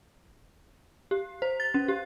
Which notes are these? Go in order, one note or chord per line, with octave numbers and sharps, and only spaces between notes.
G4
C5
A6
C#4
G4